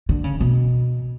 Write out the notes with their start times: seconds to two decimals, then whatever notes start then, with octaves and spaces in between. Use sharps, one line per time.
0.09 D3
0.24 C#3
0.40 B2